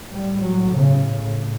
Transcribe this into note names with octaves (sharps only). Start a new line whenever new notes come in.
A2 G3
F#3
C#3